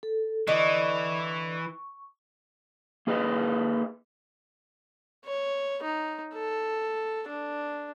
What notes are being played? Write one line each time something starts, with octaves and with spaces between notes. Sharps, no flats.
A4
D3 E3 D#5 C#6
A#3 G#4 B4 D#5
C#5
D#4
A4
D4